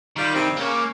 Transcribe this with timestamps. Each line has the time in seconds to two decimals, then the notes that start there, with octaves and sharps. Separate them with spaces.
0.16 D#3 G3 F4
0.34 G2 C3 C4
0.57 C#3 A#3